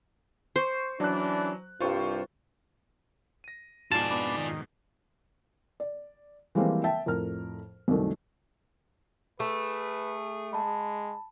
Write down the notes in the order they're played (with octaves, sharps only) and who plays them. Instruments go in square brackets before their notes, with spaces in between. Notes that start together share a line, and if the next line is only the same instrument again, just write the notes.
[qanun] C5 [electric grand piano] C6 C#6
[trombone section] E3 C#4 D4 [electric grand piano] F#3 F#6
[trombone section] C2 G2 [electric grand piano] F4 C5 C#6
[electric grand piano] A#6 D#7
[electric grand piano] F2 G#2 B2 [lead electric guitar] F4 D5 [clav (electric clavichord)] A5
[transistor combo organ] B3 D4
D#3
[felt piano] D5
E3 F3 G3 G#3 A#3 C4
E5 G5 A5
F2 A2 A#4 F6
C2 F#2 D#3 A3
[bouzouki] A3 [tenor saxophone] G#4 [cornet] B4
[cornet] G#3 [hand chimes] A5 B5